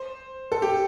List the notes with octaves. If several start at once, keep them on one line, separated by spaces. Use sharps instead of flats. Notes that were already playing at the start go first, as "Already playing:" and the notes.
Already playing: C5
A4
G4